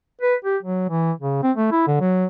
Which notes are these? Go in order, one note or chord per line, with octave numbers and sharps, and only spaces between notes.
B4
G4
F#3
E3
C#3
C4
A3
E4
D3
F#3